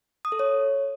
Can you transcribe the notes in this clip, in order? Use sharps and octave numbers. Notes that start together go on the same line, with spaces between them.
D#6
A4
C#5